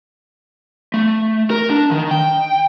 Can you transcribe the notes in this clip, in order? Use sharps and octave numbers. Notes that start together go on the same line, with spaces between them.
A3
A#4
D4
D#3
G5